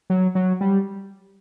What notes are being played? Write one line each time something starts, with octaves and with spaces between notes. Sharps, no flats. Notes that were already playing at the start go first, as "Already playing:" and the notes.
F#3
F#3
G3